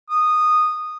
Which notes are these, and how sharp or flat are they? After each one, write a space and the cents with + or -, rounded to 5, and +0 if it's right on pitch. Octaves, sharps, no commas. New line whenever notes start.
D#6 -10